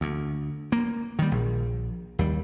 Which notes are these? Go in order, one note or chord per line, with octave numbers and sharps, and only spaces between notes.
D2
A#3
D#3 G3
A#1
D#2 G3